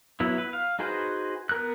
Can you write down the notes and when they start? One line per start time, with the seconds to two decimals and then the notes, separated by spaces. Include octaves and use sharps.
0.20 F#3 B3 E4
0.38 B4
0.53 F5
0.79 D#4 F#4 G#4 B4 C5
1.49 B3 A#4 F#6